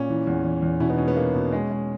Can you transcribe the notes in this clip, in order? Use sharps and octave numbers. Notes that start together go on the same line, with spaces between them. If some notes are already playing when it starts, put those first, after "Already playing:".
Already playing: A#2 C#4
E3
E2
E3
E2
B2 C#4 E4
B3 D#4
B2 C#4
B3
A#3
B2
G#3 C#4
G#3